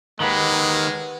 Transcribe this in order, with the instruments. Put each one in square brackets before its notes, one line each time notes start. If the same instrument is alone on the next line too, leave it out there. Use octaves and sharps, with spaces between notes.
[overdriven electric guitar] D#3 G4 [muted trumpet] G#3 [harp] B4 F#5 A#5